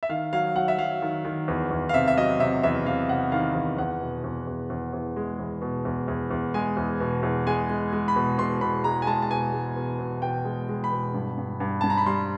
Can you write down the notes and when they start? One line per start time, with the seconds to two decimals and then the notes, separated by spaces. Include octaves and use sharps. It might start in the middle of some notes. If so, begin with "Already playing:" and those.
0.03 E5
0.09 D#3 F5
0.33 F#3 F5
0.55 F#3 F#5
0.68 E5
0.78 F#3 F5
1.02 D#3
1.25 D#3
1.48 E2
1.71 E2
1.89 F5
1.94 C3 E5
2.08 E5
2.17 F#3 D#5
2.40 C3 E5
2.63 E2 E5
2.86 C3 F5
3.09 C3 F#5
3.32 D#3 F5
3.55 E2
3.78 E2 F#5
4.01 B2
4.24 E2
4.47 E2
4.70 E2
4.93 E2
5.16 G#3
5.40 E2
5.62 B2
5.85 E2
6.08 E2
6.31 E2
6.54 G#3 G#5
6.77 E2
7.00 B2
7.23 E2
7.46 G#3 G#5
7.70 G#3
7.93 G#3
8.08 B5
8.16 B2
8.38 B2 C6
8.61 B2 B5
8.84 G#3 A#5
9.02 G#5
9.07 G#3 A5
9.22 A5
9.31 B2 G#5
9.53 G#3
9.76 B2
9.99 B2
10.22 B2 G5
10.45 G#3
10.69 G#3
10.84 B5
10.92 B2
11.14 G2
11.38 G2
11.60 G2
11.81 G2 A5
11.90 A#5
11.98 B5
12.06 G3 C6